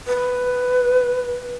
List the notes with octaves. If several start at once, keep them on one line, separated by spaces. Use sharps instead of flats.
B4